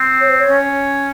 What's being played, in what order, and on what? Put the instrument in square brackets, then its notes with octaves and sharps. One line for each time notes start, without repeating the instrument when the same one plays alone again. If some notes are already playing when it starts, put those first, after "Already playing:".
Already playing: [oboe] C4
[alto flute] C#5
C5
C#5
[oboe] C#4